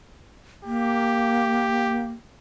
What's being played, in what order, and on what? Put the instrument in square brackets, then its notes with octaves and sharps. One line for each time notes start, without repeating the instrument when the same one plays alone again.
[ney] A#3 [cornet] G4